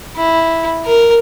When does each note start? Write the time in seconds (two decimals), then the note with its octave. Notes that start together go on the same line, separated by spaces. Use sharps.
0.16 E4
0.86 A#4